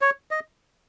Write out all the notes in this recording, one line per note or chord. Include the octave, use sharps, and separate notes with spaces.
C#5
D#5